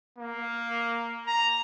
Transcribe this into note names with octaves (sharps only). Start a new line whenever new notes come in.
A#3
A#5